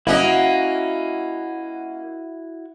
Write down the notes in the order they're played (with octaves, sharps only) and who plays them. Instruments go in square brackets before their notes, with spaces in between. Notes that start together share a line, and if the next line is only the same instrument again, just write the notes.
[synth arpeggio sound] G1 [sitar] A#3 C#4 D#5 [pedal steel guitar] E4 F#4 F#5